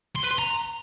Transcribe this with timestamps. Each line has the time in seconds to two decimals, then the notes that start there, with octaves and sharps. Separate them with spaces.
0.15 C6
0.23 B4
0.31 C6
0.38 A#5